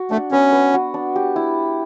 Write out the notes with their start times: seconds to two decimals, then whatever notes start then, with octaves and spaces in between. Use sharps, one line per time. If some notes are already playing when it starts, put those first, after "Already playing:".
Already playing: F#4
0.11 A3 D4
0.32 B3 C#4
0.52 B4
0.74 F#4
0.94 D4
1.16 G4
1.36 E4